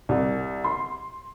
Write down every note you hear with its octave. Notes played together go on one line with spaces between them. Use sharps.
C2
C6